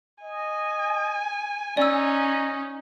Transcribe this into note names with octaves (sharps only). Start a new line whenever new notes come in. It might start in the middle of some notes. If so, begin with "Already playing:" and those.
D#5 G#5
C#4 D#4 D5 E6